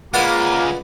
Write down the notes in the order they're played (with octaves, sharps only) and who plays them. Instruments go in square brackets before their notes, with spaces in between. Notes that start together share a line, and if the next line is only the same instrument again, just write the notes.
[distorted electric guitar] C#3 G#3 [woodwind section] A#3 [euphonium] F4 [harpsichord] B4 D5 F#5